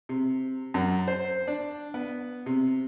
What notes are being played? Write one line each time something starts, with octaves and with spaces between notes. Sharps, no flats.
C3
F#2
C5
D4
B3
C3